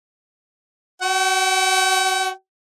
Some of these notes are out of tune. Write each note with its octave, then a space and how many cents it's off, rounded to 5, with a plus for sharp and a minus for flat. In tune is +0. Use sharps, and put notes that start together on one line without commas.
F#4 +15 G5 -40